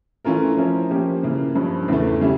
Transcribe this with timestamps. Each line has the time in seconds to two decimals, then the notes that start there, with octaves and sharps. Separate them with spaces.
0.25 E3 A3 C#4 F4 A#4
0.57 F3 C#4 E4 A#4
0.90 F3 A#3 C#4 G4
1.23 C#3 E3 A#3
1.55 G2 F3 C#4
1.88 E2 C#3 E3 A3
2.21 C#3 G3 C#4 E4